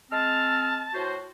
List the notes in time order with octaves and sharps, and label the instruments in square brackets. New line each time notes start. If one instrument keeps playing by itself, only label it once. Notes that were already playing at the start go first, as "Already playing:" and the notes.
[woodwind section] G#3 C4 F6 [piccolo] A5
[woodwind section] A2 F#4 C5